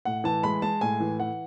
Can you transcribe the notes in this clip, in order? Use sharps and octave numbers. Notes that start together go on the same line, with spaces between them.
A2 F#5
E3 A5
G#3 B5
G#3 A5
A2 G#5
E3
E3 F#5